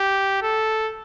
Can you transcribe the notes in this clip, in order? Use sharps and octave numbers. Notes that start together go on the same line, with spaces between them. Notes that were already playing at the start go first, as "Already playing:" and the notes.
Already playing: G4
A4